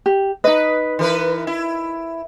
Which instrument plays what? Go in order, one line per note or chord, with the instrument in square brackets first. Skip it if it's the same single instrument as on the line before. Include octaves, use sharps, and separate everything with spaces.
[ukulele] G4
[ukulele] D#4 D#5 [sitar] B4
[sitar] E3 A#4 B4
E4